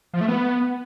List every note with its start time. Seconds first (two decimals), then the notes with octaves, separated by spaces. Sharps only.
0.14 F3
0.21 A3
0.28 B3